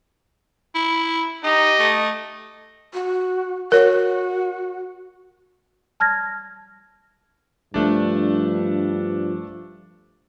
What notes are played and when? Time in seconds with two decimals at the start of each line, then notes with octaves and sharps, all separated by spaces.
0.75 E4
1.43 D#4 G4 D#5
1.79 A3
2.94 F#4
3.72 F#4 A#4 C#5
6.00 A5 F6 G#6 A#6
7.74 G2 F3 A3 D4